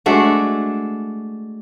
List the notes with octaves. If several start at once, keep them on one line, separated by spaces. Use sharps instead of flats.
G#3 A3 D4 F#4